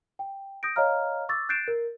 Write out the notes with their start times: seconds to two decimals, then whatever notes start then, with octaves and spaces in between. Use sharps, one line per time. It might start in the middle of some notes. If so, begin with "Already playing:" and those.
0.19 G5
0.63 D#6 G6 A#6 D7
0.76 C#5 D#5 F5 A#5 F6
1.29 C#6 D6 E6 A6
1.49 F#6 G6 A6 C7 D7 E7
1.68 A#4